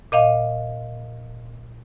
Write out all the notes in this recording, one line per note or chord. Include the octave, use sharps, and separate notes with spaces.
A#2 D#5 F5